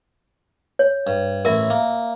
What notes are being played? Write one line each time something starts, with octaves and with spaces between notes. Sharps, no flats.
C#5
G2
A1 E4 A#4 E5
A#3